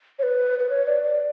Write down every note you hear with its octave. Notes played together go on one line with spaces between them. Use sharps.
C#5
B4
B4
C#5
D5
D5